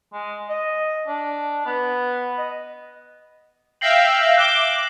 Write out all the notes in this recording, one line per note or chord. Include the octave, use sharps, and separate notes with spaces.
G#3
D#5
D4
B3
D#5
E5 F5 G5 A#6 C7 F#7
D6 F#6 E7 G7